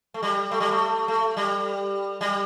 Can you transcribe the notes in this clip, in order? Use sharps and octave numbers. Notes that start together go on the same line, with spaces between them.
A3
G3
A3
G3
A3
A3
G3
G3